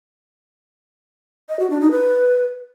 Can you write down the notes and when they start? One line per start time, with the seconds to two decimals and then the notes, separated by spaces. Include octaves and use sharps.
1.49 D#5
1.59 F#4
1.70 D4
1.81 D#4
1.91 B4